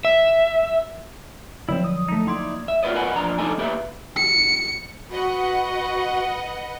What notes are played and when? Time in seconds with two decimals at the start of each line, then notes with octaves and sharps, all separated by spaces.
0.05 E5
1.69 D3 F3 F#3 C4 E4
1.84 D#6
2.08 A3 D#4
2.27 A#3 D#4 E4 D5 C6 G#6
2.68 E5
2.83 F4 F#4 A#4 B4 D5 D#5
2.95 A#4 B4 D#5 F#5 G#5
3.15 A#2 F3 D4 A#5
3.38 F2 D4 D#4 A4 D#5 G#5
3.58 A#3 G4 B4 E5
4.16 C#7
5.10 F#4 B4 D#5 F#5